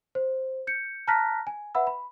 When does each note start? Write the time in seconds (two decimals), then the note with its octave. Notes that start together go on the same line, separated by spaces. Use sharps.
0.15 C5
0.67 G6 C#7
1.08 A5 A#5 F6 F#6 A#6 B6
1.47 G#5
1.75 B4 E5 F#5 B5 E6
1.87 B5